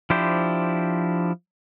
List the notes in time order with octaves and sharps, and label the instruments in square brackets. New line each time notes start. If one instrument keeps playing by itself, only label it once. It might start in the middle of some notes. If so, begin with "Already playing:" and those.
[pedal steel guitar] F3 D4 E4 G4 C5